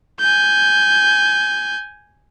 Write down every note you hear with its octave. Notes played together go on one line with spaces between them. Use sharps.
G#5 G6